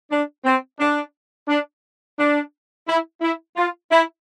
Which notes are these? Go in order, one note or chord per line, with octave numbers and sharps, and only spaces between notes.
D4
C4
D4
D4
D4
E4
E4
F4
E4